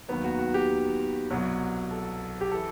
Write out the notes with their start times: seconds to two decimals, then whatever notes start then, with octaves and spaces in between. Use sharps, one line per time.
0.08 D#2 D#3 F#3 B3
0.24 F#4
0.39 F#4
0.54 G4
1.31 C2 B2 F#3
1.91 A4
2.41 G4
2.52 E3 A4